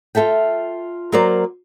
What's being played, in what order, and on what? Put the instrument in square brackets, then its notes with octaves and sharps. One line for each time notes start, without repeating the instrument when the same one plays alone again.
[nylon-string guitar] F4 F#4 A4 E5 G5
F#3 A#3 A#4 C5 D5